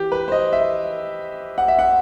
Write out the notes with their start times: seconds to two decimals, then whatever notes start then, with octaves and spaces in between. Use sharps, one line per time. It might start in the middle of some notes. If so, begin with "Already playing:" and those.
Already playing: E3 G4
0.12 B4
0.28 C5
0.32 D#5
0.53 E5
1.58 F#5
1.68 E5
1.79 F#5